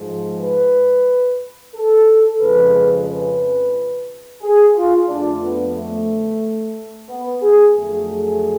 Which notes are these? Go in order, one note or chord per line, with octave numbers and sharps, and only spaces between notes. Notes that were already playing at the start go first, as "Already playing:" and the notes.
Already playing: G#2 F3 G#3
B4
A4
F2 C#3 F3 G#3 B4
B4
G#4
F4
F2 D3 F3 A3 D4
B3
A3
B3
G#4
F2 D3 F#3 A3 G#4
G#4